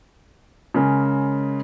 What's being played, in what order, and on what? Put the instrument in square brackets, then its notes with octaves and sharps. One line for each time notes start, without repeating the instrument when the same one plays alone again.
[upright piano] C#3 G#3 C#4 A#4